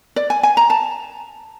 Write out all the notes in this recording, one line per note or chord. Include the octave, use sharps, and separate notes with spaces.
D5
G#5
G#5
A#5
A5